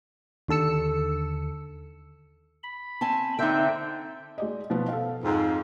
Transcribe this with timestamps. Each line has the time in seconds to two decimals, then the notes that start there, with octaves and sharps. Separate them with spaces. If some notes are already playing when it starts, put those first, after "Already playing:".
0.48 D#2 D3 A4 E6 C#7
2.63 B5
3.01 C4 G#5 A5
3.39 D3 C4 D#4 E5 G5
4.38 G#3 D5 D#5
4.70 B2 F3 B3
4.89 A4 F5
5.23 F2 G#2